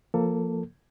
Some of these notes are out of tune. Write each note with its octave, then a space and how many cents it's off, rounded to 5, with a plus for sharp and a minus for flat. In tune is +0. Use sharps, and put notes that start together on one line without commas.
F3 +0 A#3 +0 A4 +15